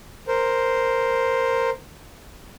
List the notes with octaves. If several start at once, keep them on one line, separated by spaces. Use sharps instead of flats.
A#4 C5